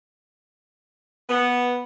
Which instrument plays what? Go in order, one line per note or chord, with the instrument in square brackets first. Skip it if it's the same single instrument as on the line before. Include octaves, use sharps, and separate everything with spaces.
[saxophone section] B3